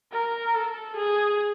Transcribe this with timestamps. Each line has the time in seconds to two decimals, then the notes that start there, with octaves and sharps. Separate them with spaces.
0.12 A#4
0.55 A4
0.96 G#4